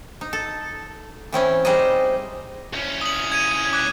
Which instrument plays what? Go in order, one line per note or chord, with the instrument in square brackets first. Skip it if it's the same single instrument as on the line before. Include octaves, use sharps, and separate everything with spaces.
[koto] D#4
A4
E3 C4 C#4 E4
G3 G#3 D#4 C5 D#5
[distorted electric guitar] C2 C#4
[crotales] D#6 F#7
G#6 D#7
D6 F#6